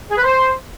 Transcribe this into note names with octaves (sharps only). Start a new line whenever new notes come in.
G#4
B4
C5